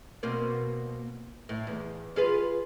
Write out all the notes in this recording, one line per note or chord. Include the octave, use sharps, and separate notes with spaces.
B2 A#3 C4
A2
E2
F4 G#4 B4